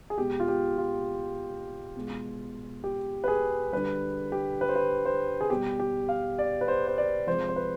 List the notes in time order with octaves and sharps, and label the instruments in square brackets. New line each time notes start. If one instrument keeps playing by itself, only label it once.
[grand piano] G#4
B2 G#3 G4
F4
G4
F4
B2 G#3
G4
B4
G#4
D3 G3 B4
G4
B4
C5
B4
C5
G#4
B2 G3 G4
G4
F5
D5
B4
C5
C5
D5
C3 F3 G#3 C5
C5
B4